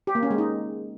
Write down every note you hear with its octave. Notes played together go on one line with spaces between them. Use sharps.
G4
A#3
C#4
G#3
D#4